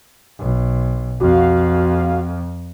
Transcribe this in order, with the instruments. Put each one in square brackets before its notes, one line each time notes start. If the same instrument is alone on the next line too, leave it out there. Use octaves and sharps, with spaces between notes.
[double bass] B1
[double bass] F2 [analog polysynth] F#4 F5